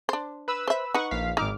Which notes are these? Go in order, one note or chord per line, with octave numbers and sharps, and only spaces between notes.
D4 C5
B4 B5 E6
C5 E5
D#4 B4 F#5 C#6
A#1 F5 B6
G#1 D#4 D6 F6